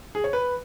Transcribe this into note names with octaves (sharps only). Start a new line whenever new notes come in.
G#4
C#5
B4